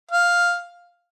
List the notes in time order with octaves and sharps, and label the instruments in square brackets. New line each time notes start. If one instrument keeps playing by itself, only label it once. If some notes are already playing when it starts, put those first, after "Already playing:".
[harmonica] F5